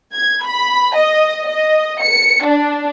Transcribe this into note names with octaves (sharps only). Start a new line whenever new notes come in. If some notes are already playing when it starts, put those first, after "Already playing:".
G#6
B5
D#5
D#5
C#7
D4